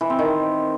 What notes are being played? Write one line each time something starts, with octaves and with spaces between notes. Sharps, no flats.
E3
C4
D#3